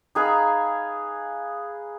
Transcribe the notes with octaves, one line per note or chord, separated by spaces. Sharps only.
D#4 G#4 B4 F5